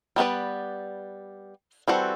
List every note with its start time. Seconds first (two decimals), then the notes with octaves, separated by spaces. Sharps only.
0.16 G3 B3 F#4 B4 D5
1.88 E3 G3 C4 F#4 A4